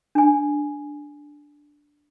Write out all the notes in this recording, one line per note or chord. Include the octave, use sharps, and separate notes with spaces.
D4 G#5